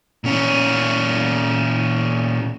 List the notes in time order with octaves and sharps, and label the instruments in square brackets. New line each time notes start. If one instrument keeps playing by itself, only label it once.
[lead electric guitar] A#2 C#4